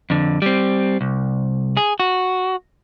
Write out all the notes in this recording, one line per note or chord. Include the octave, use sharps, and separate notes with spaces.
F2 D3
G3 C4
C2
G#4
F#4